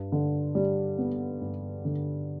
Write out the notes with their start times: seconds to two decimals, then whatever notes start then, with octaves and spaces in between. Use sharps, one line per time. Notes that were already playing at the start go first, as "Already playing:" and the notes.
Already playing: G2
0.12 D3
0.55 G3
0.98 B3
1.41 G2
1.85 D3